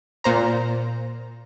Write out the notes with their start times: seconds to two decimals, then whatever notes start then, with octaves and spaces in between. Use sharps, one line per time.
0.24 A#2 C5 A#5